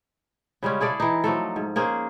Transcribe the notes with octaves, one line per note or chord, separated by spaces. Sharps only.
C#3 G3 G#3 C#4
E4 G#4 A4 D5
E3 D#4
F3 F#3 A3 A4
G#2
A#3 C#4 G#4 C5